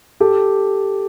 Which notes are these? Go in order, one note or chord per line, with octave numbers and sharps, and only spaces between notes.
G4 A4